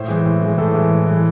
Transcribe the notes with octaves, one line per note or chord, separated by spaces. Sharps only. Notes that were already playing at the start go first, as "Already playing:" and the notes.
Already playing: A2 C5
E3 G#3
A2
E3 G#3
A2 A4
E3 G#3
A2
E3 G#3